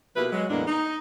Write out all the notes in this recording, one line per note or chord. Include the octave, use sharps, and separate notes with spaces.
B2 F3 A#3 E4 G4 B4
F#3 G#3
E2 A2 G#3 A#3 B3 D4
D#4